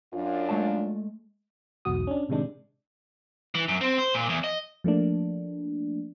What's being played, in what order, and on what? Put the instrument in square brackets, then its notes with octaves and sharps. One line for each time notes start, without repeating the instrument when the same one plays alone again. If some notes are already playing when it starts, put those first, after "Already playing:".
[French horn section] F#2 D4 F4
[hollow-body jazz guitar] G#3 A3 A5
[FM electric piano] B1 E2 G#2 F#4 D#6
C#4 D4
A2 C3 D#3 G#3 D4
[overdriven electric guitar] E3
F#2
C4
C5
A#2
E2
D#5
[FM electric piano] F3 A3 A#3 D4